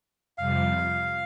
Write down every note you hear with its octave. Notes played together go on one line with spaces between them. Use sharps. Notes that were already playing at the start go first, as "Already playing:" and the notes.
F2 C3 G3 F5